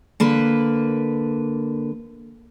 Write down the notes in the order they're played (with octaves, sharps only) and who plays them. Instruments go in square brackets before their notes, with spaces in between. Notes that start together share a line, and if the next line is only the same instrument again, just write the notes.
[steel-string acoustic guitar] D3 A#3 B4